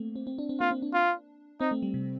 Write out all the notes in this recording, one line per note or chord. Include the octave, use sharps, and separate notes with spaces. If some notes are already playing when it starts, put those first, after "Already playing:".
Already playing: A3 A#3 C4
C4
C4
D4
C4
A#3 F4
C4
D4
F4
C4 D#4
A3
G3
C3